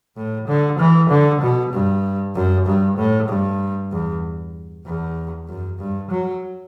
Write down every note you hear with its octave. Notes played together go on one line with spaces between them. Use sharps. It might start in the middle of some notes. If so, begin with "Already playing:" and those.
A2
D3
E3
D3
B2
G2
F#2
G2
A2
G2
E2
E2
F#2
G2
F#3